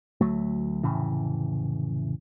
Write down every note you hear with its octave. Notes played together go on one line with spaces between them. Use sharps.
D2 F#3 A3
F1 A2 C#3 E3